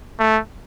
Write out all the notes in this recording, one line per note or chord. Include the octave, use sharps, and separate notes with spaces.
A3